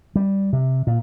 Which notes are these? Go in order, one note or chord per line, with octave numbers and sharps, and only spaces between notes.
G3
C3
A#2